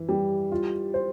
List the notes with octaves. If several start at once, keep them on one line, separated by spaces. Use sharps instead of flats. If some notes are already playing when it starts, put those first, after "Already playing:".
Already playing: E3
G3
F4
C5